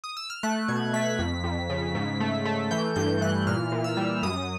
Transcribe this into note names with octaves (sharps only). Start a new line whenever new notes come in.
D#6
E6
F6
A3 F#6
B2 G#6
A3 B6
F2
F2
C#3
G#2
A3
A3
E3 G6
G2 G6
E3 F#6
A#2 F6
A#2
E6
G3
F#2 D#6